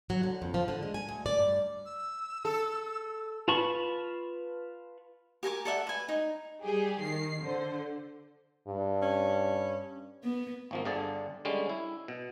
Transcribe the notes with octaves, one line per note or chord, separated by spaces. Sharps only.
F#3
D3
F2
F3
D3
G#3
G#5
D2
D5
G2
E6
A4
F4 B4 A5 B5 C#6
G4 A#4 G#5 D6
A4 D5 E5 F#5
B4 G#5
D#4
G3 G4 G#4
D#3 C7
D3 C5
G2
C#4
B3
G#1 F3 A#3
G1 G2 D3 G#4 D5 A5
D3 G3 G#3 C#4
E4
B2